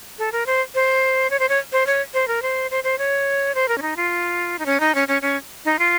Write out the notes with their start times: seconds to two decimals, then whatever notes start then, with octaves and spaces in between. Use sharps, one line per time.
0.19 A4
0.32 A#4
0.46 C5
0.75 C5
1.30 C#5
1.39 C5
1.49 C#5
1.72 C5
1.87 C#5
2.14 C5
2.28 A#4
2.42 C5
2.71 C5
2.84 C5
2.98 C#5
3.55 C5
3.68 A#4
3.78 C#4
3.82 D#4
3.97 F4
4.59 D#4
4.66 C#4
4.80 D#4
4.95 C#4
5.08 C#4
5.22 C#4
5.65 D#4
5.79 F4